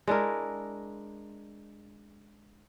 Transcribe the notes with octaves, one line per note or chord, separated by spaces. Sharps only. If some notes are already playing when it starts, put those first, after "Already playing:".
G#3 D4 E4 A#4